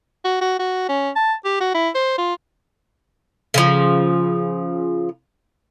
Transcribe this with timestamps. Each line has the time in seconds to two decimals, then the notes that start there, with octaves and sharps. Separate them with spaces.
0.25 F#4
0.41 F#4
0.59 F#4
0.89 C#4
1.16 A5
1.45 G4
1.60 F#4
1.74 E4
1.95 C5
2.18 F4
3.54 C#3 E3 F3